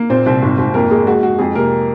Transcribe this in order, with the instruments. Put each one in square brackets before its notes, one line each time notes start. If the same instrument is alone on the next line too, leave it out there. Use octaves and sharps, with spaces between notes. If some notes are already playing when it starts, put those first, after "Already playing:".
Already playing: [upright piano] A#3
A#2 C4 C5
C2 C4 C5
G#1
G#1
F2 A#3 A#4
G#3 A#3 G#4
G#3 F#4
G#3 F#4
F2 G#3 G#4
C3 A#3 A#4